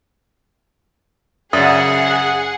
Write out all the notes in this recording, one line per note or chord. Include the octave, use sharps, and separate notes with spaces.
F#2 C#3 G#4 D5 E5 F#5 D#6